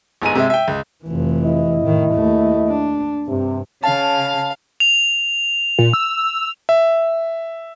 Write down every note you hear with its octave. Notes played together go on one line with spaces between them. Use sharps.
G1 G#2 G#5 D#7
C3 G#3 E5
E5 G5
C#2
F1 E3
E4 D#5
A2 D#3
D#2 A3
D4
G2 C3
C#3 F5 A5
F7
A#2
E6
E5